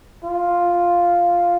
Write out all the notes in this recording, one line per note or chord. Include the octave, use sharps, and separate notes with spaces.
F4